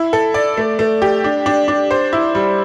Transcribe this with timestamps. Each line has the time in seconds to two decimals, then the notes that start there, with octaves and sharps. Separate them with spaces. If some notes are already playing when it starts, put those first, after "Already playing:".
Already playing: E4
0.13 A4
0.34 D5
0.57 A3
0.79 A3
1.02 G4
1.24 D4
1.46 D4
1.68 D4
1.91 C5
2.13 E4
2.35 G3